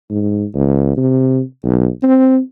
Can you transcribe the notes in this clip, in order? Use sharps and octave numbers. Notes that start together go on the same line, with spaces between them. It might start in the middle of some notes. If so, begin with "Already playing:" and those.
G#2
C#2
C3
B1
C4